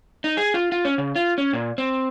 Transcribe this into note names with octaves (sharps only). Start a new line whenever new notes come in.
D#4
G#4
F4
F4
C#4
C#3
F4
C#4
A#2
C4